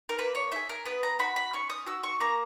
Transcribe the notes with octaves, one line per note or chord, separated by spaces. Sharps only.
A#4
A#3 B4
C#5
E4 G#4 E5
A#4
B3 B4
A#5
F#4 B5
B5
C#4 C#6
D#6
F#4 E6
C#6
A#3 A#5